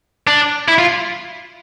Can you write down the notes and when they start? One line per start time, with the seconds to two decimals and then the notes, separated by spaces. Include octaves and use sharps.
0.27 D4
0.68 E4
0.78 F4